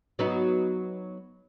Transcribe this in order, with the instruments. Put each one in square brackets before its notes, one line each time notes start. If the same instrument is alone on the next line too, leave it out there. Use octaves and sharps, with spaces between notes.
[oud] F#3 B3 D#4